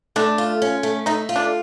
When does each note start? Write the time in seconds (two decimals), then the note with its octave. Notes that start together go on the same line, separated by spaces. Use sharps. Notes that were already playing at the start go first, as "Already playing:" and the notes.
0.16 A3 D4
0.38 F4
0.62 C#4
0.83 A3
1.06 A3 D#4
1.29 F4
1.36 D4